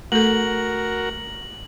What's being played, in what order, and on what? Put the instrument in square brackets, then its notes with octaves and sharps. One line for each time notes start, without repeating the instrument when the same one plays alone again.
[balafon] A3 A4 [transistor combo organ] F#4 A#4 [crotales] F#7